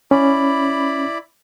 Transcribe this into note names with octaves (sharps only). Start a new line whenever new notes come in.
C#4 E4 D5 B5